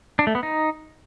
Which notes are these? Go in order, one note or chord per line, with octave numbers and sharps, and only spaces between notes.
D4
A3
B3
D#4